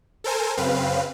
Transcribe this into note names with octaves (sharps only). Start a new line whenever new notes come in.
A4 A#4 C5 G#5
F#2 C#3 C4 B4 F5